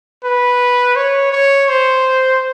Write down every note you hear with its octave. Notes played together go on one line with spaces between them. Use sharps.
B4
C#5
C#5
C5